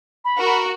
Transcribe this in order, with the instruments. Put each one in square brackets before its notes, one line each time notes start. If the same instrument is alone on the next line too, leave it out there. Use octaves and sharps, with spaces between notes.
[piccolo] B5
[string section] F#4 A#4
[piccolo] B5